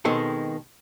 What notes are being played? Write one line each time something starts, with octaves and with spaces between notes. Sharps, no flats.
B2 D#3 G#3 C4 A4